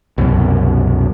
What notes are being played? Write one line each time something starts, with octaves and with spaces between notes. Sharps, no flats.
C2 F#2 B2